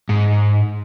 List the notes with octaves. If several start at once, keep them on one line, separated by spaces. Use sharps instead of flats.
G#2